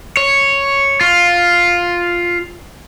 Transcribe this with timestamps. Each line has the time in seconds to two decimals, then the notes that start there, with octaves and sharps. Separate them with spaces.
0.17 C#5
1.01 F4